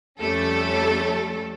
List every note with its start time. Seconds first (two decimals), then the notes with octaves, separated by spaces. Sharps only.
0.20 F2 G3 A3 C#4 A4